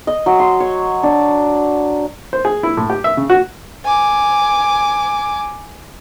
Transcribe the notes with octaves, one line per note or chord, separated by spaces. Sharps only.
D#5
F#3
C6
C#5
D4
C5
G#4
E4
A2
G4
E5
C#3
F#4
G#5 D6